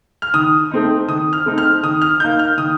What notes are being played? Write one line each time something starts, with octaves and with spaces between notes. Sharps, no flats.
F6
D#3 D#6
A3 C4 D#4
D#3 D#6
F6
A3 C4 D#4
F6
D#3 D#6
F6
A#3 D#4 G6
F6
D#3 D#6